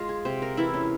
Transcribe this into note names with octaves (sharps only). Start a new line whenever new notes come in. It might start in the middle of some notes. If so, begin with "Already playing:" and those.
Already playing: G#3 F4
G#4
C3 C5
A#4
E3 E4
C#4